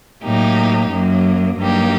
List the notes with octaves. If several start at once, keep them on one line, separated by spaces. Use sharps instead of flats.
A2 F#3 A#3 D#4 G4
F#2 F#3 A#3
G2 F#3 A#3 D#4 G4